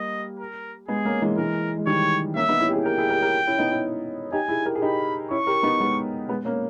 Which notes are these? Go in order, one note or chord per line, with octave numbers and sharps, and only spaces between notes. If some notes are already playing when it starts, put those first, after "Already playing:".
Already playing: G3 A#3 D#5
A#4
G#3 B3 G#4
A#3 C#4
E3 G#3
E3 G#3 A#4
G#3
D#3 G3 C#5
A#3 C#4 E5
B3 D#4
C#4 E4
G4
E4 G#4
G4 A#4 G5
E4 G#4
G4 A#4
G4 A#4
C#4 E4
B3 D#4
C#4 E4
D#4 G4 G#5
E4 G#4
G4 A#4
G#4
D#4 G4 B5
C#4 E4 C#6
G4 A#4
B3 D#4
G#3 B3
G#3 B3
A#3 C#4